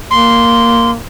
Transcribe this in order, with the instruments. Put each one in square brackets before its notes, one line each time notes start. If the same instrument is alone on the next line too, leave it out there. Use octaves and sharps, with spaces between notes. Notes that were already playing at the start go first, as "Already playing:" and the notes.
[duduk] A#3 [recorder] C6